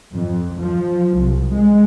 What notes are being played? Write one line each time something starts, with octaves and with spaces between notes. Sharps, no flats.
F2
F3
C2
G#3